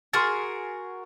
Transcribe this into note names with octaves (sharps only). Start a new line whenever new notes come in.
F#4 G#4 A#4 C6 F6 A6